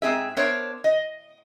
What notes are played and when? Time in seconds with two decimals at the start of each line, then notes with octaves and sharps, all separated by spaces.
0.02 G#2 C4 G#4 E5
0.37 B3 D4 A#4 C5 C#5 E5
0.84 D#5